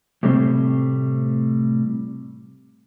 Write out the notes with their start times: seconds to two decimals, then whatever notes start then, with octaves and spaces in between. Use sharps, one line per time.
0.23 A2 C3 G3 A3 C4 C5